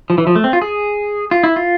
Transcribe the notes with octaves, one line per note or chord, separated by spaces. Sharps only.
F3
E3
F3
A3
C4
F4
G#4
F4
E4
F4